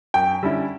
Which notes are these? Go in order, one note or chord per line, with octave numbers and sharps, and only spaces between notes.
F#2 G5
D3 G3 C#4 E4